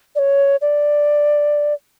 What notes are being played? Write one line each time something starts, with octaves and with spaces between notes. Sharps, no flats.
D5
C#5
D5